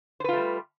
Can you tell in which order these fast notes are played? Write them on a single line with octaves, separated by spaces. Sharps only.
C5 B4 F4 A3 G3